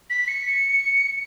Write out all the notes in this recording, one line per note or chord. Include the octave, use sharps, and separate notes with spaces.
B6
C#7
C#7